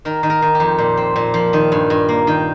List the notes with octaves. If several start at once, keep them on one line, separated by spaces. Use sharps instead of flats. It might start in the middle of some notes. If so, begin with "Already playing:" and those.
D#3 A#4
D#3
A#4
D#3
G4
F2
A#2
C4
A#2
F3
D#3
G2
G2
A#3
D#3 G5